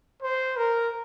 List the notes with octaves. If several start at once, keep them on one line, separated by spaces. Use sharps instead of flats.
C5
A#4